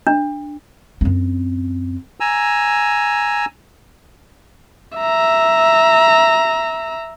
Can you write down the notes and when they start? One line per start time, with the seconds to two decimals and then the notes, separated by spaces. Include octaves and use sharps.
0.07 D4
1.01 F#2 C4
2.20 G#5 A#5 E6
4.98 E5 A#5